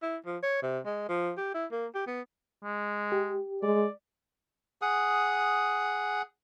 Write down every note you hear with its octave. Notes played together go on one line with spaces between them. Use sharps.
E4
F3
C#5
C3
G#3
F3
G4
E4
A#3
G4
B3
G#3
G4
G#3 D5
G#4 F#5 D#6